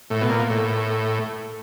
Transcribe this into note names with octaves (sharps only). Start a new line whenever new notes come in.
A2
B2
A#2
A2